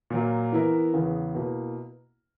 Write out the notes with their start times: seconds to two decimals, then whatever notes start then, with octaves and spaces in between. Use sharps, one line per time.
0.10 A#2 F#3 A#3
0.52 E3 B3 E4 A#4
0.94 E2 C#3 E3 B3
1.34 B2 A#3 E4 B4